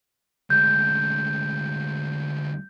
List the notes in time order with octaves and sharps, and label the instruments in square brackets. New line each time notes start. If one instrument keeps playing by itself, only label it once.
[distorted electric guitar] D2 G#3 [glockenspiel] G6